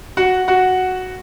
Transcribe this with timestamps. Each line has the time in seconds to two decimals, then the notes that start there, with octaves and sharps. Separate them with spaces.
0.17 F#4 F#5
0.48 F#4 F#5